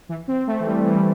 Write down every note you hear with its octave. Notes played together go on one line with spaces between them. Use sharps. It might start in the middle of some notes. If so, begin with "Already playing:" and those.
E3
C4
A3
E3
G3
E3
G3